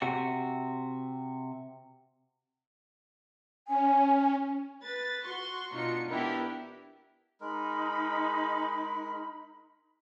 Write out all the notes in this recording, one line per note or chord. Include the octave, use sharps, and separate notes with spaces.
C3 F#4
C#4 G#5
B4 A6
F#4 C6 C#6
B2 D4 D#4 F4 C#7
B3 D4 E4 G4 A#4
G#3 D#4 A#4 B5